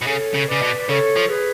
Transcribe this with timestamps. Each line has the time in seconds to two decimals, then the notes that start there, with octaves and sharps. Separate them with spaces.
0.02 B2
0.07 C#3 A4 C#5
0.34 C#3
0.48 C#3 B4 D5
0.62 B2
0.80 D5
0.88 C#3 A4 C#5
1.16 F3
1.29 G#4 B4